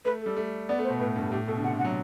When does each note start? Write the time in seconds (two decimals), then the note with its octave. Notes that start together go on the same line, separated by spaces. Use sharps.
0.05 A3 B4
0.21 G3 A4
0.37 A3
0.69 B3 D5
0.79 A3
0.84 C5
0.90 B2
1.00 A2 B4
1.16 G2 A4
1.28 A4
1.32 A2 G4
1.47 B2 A4
1.57 D3
1.64 C3 F#5
1.74 D3
1.79 F#5
1.85 F#3